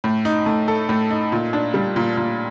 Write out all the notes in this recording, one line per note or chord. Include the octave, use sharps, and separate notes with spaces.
A2
D#4
A3
A4
A2
D#4
A#2
D4
G3
A#2
A#2